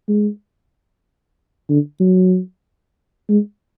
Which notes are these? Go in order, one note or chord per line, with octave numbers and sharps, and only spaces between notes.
G#3
D3
F#3
G#3